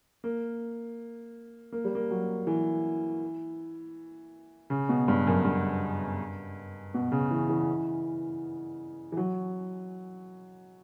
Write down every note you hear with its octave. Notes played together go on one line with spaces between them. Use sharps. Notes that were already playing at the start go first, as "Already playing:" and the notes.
A#3
A#3
G3
A#3
F#3
E3
C#3
B2
G2
F#2
G2
B2
C#3
E3
E3
E3
F#3